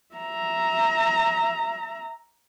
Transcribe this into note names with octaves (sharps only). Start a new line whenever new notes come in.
E5 A#5